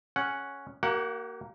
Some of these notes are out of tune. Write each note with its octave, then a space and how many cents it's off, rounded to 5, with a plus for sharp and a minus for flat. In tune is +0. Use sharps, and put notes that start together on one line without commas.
C#4 +0 G#4 +15 F#5 +0
A#3 +0 G4 -45 F#5 +0